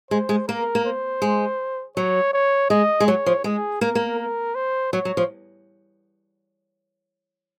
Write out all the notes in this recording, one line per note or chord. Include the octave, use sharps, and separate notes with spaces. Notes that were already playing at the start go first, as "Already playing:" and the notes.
G#3 C5
G#3
A#3 A#4
A#3
C5
G#3
F#3 C#5
C#5
G#3 D#5
G#3
F#3 C#5
F3
G#3 G#4
A#3 A#4
A#3
A#4
C5
F#3 C#5
F#3
F3